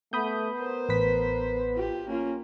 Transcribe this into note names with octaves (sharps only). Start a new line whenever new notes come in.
A3 B3 B5 D#6 G6
A#4 C5
A1 B4 B6
F4 G4
A#3 C#4 F4